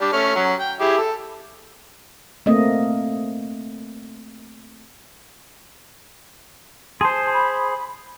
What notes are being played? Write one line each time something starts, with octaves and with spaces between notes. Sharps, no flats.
G3 D4
A3 C#4 F6
F#3 C#4
G5
E4 G4 G#4
A4
A3 A#3 C4 D#5
G#4 C5 A5 C6
B5